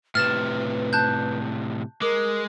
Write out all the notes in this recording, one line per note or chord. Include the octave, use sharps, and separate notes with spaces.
A2 C3 B4 F6 A6 E7
A5 F#6 G6
G#3 A#4 D6